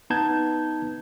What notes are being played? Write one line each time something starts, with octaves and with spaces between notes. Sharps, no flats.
B3 D#4 B4 A5 G6 G#6